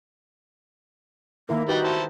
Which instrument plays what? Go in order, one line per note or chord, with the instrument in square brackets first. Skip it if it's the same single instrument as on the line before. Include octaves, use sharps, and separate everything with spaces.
[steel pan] D#3 E4 A#4 [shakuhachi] A#3
[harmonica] G3 [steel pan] D#4 G4 B4 [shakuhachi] F#4
[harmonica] E4 C5 A5